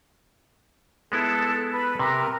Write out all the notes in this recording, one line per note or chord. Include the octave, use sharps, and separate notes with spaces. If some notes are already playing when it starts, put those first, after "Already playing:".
G#3 B3 E4 A4
B4
C3 A#4